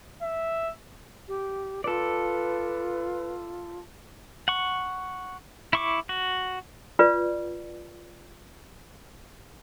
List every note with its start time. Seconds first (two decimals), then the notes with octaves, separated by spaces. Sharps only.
0.22 E5
1.28 G4
1.84 F4 A4 B4 D5
4.48 F#5 C#6
5.73 E4 C#6 D6
6.09 F#4
6.99 F4 B4 D5